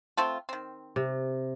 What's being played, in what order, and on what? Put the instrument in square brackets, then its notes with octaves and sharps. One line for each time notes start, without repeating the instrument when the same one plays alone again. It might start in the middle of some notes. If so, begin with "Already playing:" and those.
[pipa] A3 C4 F4
D#3 C4
[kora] C3